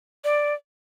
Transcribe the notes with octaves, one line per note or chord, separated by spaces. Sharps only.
D5